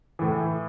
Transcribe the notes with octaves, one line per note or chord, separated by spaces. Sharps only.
A2 E3